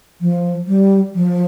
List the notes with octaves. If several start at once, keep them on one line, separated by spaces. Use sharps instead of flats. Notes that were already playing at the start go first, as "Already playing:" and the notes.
F3
G3
F3